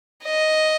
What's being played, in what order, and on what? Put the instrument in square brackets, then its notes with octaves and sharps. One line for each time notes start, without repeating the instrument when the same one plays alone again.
[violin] D#5